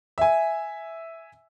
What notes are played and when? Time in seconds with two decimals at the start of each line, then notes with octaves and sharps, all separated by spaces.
0.18 E5 G#5